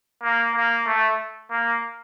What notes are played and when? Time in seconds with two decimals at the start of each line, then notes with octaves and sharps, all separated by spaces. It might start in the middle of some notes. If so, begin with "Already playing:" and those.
0.23 A#3
0.55 A#3
0.87 A3
1.51 A#3